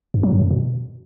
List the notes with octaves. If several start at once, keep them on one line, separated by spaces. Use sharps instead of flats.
G2
F#3
G2
F#2
B2